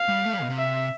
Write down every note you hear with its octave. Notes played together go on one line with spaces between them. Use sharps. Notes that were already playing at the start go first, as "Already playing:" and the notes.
Already playing: F5
G3
A3
G3
B2
C3
E5